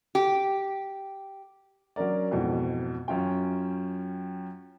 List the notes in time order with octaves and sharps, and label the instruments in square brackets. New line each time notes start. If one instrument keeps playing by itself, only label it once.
[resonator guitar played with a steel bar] G4
[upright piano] F#3 C#4 D4 A#4 D5
F2 G#2 B2 E3
F#2 C#4 F4 G5